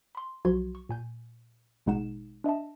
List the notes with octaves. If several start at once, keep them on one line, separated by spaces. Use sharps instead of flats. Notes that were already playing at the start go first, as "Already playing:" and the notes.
B5 C6
B1 F3 F#3 F#4 C6 G#6
C#6
A#2 G#5 G6
A1 B2 G#3 D#4 F#5 E7
D4 D#5 E5 A5